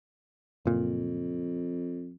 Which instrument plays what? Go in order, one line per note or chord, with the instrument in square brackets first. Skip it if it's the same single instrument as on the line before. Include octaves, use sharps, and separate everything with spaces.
[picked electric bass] F#1 A#2 [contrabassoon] F2